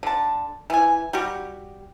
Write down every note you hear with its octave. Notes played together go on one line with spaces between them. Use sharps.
D3 A5
E3 G#5
G3 F#4 G4